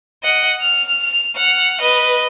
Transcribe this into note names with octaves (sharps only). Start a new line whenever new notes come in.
D#5 F#5
F6 F7
F7
F#5 F6
B4 D#5